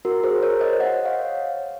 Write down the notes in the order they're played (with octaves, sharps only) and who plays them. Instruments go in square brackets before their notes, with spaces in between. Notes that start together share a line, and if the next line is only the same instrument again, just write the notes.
[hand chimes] F#4 A#4
G#4 C5
A#4 C#5
C5 D#5
D#5 F#5
C#5 F5